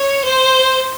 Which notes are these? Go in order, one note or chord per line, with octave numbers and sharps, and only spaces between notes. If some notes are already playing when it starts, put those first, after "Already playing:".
Already playing: C#5
C5